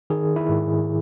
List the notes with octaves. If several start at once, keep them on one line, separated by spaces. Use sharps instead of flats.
D#3 G#4
E4
G#2